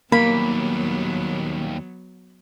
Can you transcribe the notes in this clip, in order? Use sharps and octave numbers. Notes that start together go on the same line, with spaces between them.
D#2 F#3 G3 A#3 B3 B5